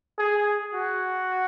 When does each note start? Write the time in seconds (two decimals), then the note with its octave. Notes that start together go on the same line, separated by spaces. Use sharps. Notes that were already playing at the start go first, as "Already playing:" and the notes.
0.19 G#4
0.74 F#4